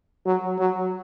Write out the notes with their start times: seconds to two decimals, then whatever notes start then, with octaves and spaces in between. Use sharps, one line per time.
0.26 F#3
0.58 F#3